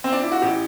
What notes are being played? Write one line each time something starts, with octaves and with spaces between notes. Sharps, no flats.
C4
D4
E4
F#4
A1 E3 G4